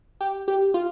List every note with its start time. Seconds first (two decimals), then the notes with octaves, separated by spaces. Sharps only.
0.21 G4
0.48 G4
0.74 F4